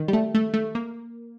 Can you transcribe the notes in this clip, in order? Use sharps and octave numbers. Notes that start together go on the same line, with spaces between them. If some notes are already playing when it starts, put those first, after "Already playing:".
Already playing: D#3
G3
A3
A3
A3
A#3